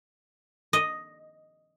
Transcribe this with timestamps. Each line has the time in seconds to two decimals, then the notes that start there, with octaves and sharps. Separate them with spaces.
0.73 D#5